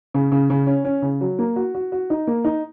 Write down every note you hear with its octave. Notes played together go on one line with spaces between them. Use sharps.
C#3
C#3
C#3
C#4
C#4
C#3
F#3
A#3
F#4
F#4
F#4
D#4
A#3
D#4